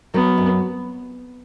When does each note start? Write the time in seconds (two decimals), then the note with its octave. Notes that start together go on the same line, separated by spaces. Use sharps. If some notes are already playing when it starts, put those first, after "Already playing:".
0.14 F#3 B3
0.37 F#2